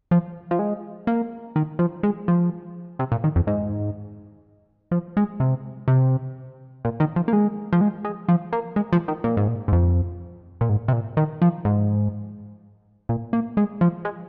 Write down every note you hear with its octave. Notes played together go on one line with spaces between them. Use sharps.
F3
F3
G#3
A#3
D#3
F3
G#3
F3
C3
A#2
D#3
F2
G#2
F3
G#3
C3
C3
A#2
D#3
F3
A#3
G#3
F3
G#3
G#3
F3
A#3
G#3
F3
D#3
A#2
G#2
A#2
G#2
F2
A#2
G#2
C3
A#2
D#3
F3
G#2
A#2
A#3
G#3
F3
G#3